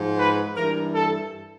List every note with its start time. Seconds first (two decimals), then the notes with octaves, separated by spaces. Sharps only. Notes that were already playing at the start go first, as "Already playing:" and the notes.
Already playing: G#2 F3
0.18 B4
0.56 G2 E3 A#4
0.94 A4